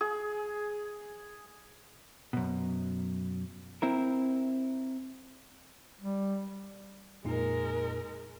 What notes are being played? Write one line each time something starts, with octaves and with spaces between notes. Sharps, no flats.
G#4
F#2 B2
C4 E4 A#4
G3
F2 A#2 G#3 D#4 A#4